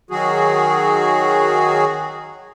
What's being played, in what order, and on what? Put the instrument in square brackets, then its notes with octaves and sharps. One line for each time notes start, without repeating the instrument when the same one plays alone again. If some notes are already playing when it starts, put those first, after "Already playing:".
[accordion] D#3 F#3 F#4 G#4